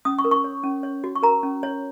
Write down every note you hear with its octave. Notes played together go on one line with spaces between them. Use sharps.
C#4 D#6
C#6
A#4
C#6
C#5
C#4
C#5
F#4
C#6
A#4 A#5
C#4
C#5